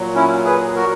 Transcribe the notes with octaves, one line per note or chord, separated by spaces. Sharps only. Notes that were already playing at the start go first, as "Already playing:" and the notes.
Already playing: A#2 F#3
C#4 E4
G#4 B4
F#4 A#4